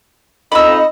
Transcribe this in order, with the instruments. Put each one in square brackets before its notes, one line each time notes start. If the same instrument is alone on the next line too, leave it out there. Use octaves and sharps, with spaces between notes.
[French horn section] F2 D#4 [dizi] D#5 [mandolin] B5 E6